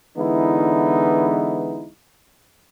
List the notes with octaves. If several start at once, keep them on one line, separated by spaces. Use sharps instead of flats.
D3 E3 G#3 B3 D#4 E4